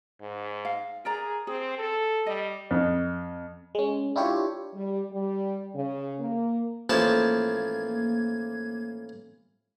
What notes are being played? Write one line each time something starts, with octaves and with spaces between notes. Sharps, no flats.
G#2
F5
G#4 A#4 D5 A#5
C4 G#4
A4
G3 D#5
F2
G#3 C#4
D4 E4 F4 G4 C#5
G3
G3
C#3
A#3
A1 F3 A#3 A5 G#6